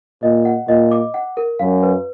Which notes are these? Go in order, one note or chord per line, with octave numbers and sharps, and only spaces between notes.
A#2 D#5
F#5
A#2 D#5
D6
F#5
A#4
F#2 F5
B4